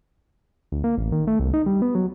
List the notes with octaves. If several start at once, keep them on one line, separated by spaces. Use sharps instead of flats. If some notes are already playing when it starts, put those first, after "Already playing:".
D2
A#3
A1
D#3
A3
C2
D#4
G3
B3
F#3